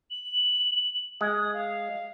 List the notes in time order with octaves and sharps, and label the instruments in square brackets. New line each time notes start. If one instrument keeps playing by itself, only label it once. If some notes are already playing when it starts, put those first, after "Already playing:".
[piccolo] F#7
[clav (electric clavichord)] G#3 [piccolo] D#6
[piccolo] F5